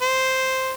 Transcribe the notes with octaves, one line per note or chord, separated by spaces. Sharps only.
C5